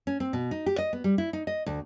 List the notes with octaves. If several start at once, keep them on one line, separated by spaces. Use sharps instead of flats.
C#4
C4
B2
D#4
G4
D#5
B3
G3
E4
D#4
D#5
D2